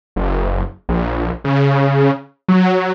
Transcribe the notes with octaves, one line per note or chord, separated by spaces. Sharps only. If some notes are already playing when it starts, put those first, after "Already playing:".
F#1
A#1
C#3
F#3